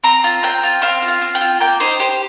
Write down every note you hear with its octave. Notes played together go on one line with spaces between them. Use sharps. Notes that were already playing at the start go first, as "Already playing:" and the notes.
C4 A#5
F4
C4 G5
F4
C4 F5
F4
F5
C4
G5
F4
A#3 G5
D#4 C5
G4 C5